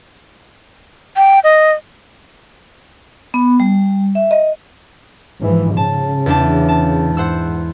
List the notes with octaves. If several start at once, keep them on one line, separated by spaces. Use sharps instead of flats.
G5
D#5
B3
G3
E5
D#5
G#2 E3 F3
C#3 A5
E2 D4 A5
A5
G#2 C5 F#5 E6